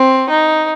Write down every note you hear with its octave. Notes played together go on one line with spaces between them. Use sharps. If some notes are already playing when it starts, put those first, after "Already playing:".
Already playing: C4
D#4